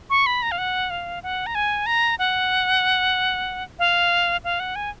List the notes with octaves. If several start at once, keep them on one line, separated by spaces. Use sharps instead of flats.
C#6
B5
A#5
F5
F#5
F5
F#5
A#5
G#5
A#5
F#5
F5
F5
F#5
G#5